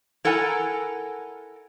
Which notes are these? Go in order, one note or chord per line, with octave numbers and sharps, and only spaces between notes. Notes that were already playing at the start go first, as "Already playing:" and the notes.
E4 A4 A#4 F#5 G#5 A#5